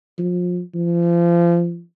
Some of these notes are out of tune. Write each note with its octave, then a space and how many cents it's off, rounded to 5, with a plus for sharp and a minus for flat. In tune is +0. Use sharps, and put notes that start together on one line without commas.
F3 +30
F3 -30